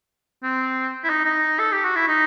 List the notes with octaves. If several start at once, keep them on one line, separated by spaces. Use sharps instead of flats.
C4
E4
D#4
D#4
A4
G4
F#4
E4
D#4